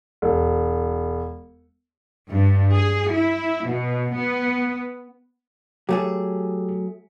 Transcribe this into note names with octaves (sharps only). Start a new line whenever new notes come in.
E1
G2
G#4
E4
B2
B3
F#3 A3 G4 G#4